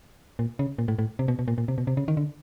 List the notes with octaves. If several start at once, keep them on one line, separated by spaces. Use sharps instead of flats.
A#2
C#3
A#2
A2
A2
C3
B2
B2
A#2
A#2
C3
B2
C3
C#3
D#3
D3